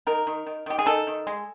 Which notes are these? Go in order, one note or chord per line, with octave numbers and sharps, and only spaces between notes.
D#3 A#4
D#3
D#3
D#3 G4
G#4
D#3 A4
D#3
G#3